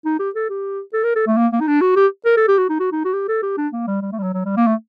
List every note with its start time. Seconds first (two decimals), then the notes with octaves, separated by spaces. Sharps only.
0.05 D#4
0.19 G4
0.35 A4
0.49 G4
0.93 A4
1.04 A#4
1.16 A4
1.27 A3
1.37 A#3
1.52 A#3
1.61 D#4
1.67 D4
1.81 F#4
1.96 G4
2.25 A#4
2.37 A4
2.48 G4
2.58 F#4
2.69 D#4
2.80 F#4
2.92 D#4
3.05 F#4
3.14 G4
3.28 A4
3.42 G4
3.57 D4
3.73 A#3
3.87 G3
4.02 G3
4.12 A3
4.18 G3
4.23 F#3
4.34 F#3
4.45 G3
4.57 A#3
4.67 A3